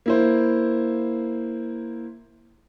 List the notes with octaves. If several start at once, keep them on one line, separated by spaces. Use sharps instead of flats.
A#3 E4 C5